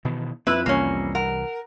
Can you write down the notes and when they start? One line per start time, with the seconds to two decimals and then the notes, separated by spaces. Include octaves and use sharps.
0.05 B2 D#3 E3
0.47 F2 F3 E4 B4 E6
0.66 C2 E3 G3 A#3 C#4
1.15 A#4 F#5